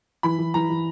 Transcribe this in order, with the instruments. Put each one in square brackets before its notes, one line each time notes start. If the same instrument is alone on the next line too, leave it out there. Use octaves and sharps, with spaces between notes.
[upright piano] E3 [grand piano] B5
[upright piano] E3
[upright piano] E3 [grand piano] A#5
[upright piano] E3